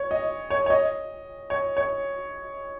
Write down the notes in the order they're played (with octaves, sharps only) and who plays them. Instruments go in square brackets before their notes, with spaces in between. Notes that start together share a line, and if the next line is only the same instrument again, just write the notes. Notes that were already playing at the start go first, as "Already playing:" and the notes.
Already playing: [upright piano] C#5
D#5
C#5
C#5
D#5
C#5
C#5